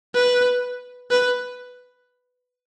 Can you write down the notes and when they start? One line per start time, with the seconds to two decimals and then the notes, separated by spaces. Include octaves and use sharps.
0.15 B4
1.11 B4